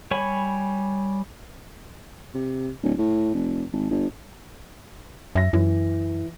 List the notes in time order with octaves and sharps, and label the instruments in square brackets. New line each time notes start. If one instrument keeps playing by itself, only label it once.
[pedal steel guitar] G3 C#5 G#5 B5 C#6
[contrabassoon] C3
D1
A2
F1
G#1
G1
[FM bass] F#2 [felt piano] E5 A#6
[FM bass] F#2 [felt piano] E3